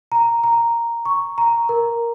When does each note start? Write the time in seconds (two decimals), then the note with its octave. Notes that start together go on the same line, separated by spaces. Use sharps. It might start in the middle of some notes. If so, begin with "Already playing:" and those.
0.12 A#5
0.44 A#5
1.05 C#6
1.38 A#5
1.69 A#4